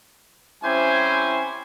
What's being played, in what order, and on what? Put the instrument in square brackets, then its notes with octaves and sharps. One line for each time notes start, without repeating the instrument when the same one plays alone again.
[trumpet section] G3 C4 C#4 E4 C5 G#5